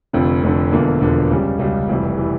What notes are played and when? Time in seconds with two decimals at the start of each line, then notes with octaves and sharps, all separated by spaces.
0.13 F1 F2 D3
0.43 F1 F2 D3
0.72 E1 E2 D3 F3 A#3
1.01 E1 E2 D3 F3 A#3
1.30 C#2 C#3 G3 C#4
1.59 C#2 C#3 G3 C#4
1.88 F1 F2 E3 G3
2.18 E3 G3